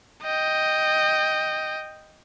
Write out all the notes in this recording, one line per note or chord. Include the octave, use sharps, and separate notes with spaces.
D#5 G5